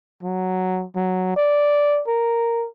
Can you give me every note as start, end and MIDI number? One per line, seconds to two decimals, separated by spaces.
0.23 0.86 54
0.96 1.34 54
1.36 2.02 74
2.08 2.67 70